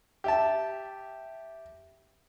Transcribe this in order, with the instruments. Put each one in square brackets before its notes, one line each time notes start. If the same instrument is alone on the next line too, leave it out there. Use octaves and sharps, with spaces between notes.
[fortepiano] G4 E5 A5